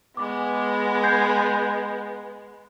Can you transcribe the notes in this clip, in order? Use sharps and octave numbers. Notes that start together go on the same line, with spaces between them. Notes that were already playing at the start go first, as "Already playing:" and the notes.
G#3 B3 D6
G6 G#6 C7